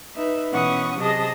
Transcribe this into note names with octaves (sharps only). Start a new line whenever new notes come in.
D#4 B4 E5
B2 E3 C#4 F#5 C#6 D#6
C3 F#3 G#4 D#5 A5 A#6